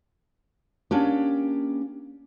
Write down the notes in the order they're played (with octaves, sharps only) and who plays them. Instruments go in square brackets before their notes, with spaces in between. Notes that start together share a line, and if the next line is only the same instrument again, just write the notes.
[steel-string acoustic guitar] A#3 C#4 D4 G4